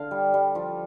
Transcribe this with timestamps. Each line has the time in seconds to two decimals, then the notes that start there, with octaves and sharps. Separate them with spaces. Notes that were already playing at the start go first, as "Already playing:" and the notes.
Already playing: D3 F5
0.11 G3
0.34 G3
0.55 F3